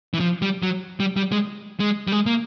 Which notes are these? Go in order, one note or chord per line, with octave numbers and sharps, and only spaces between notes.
E3
F3
G3
F#3
G3
G3
G#3
G#3
G3
G#3
A#3